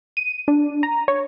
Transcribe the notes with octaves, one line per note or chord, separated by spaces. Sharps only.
D#7
D4
A#5
C#5